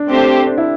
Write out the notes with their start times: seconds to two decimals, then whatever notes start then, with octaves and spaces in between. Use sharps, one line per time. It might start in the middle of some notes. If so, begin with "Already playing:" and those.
Already playing: D4
0.09 A3 C4 G4 C5
0.47 D4
0.58 E4